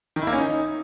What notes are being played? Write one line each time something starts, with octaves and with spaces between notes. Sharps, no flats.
D#3
E4
A#3
C#4
D#4